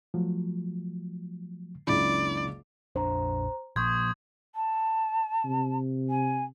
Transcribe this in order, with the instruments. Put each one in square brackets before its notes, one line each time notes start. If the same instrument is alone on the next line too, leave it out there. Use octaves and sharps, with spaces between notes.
[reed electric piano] F3 F#3 A3
[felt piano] F#1 C#2 C#3 [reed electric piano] D4 E4 B5 [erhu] D5
[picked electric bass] A#1 F2 D4 [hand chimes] C5 A#5
[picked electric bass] A#2 F3 A#3 [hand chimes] C6 G6 [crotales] C#6 D#6 G#6
[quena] A5
[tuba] C3
[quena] G#5